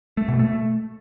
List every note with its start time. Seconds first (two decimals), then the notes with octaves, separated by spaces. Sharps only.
0.17 A3
0.28 B2
0.39 A3